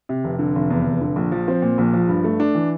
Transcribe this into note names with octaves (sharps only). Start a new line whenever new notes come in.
C3
F1
D3
F1
E2
F1
D3
A#1
F3
C4
A#2
A#1
F3
G2
A3
D4
E3